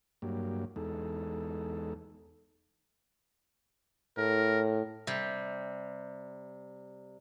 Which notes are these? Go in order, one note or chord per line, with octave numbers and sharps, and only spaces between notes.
G2 F#3 A#3 G4
E2 G#3 D#4 A4
A2 A#4
C3 G3